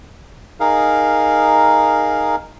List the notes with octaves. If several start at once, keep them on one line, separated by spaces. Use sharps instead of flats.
D#4 G#4 A#4 F5